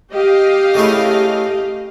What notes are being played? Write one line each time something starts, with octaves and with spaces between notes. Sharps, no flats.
G4 D#5 F5
C#3 A3 E4